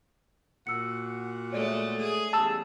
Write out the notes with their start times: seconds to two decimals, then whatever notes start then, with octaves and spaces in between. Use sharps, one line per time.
0.67 A#2 F#4 F#5 E6 C#7
1.53 G#3 A3 A4 C#5 D5
1.99 G#4
2.33 E2 C#3 G3 A5 E6